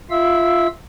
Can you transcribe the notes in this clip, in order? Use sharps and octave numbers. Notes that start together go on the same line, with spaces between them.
F4 E5 F5 E6